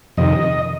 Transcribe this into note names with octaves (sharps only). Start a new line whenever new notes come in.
F2 C3 D#3 D#5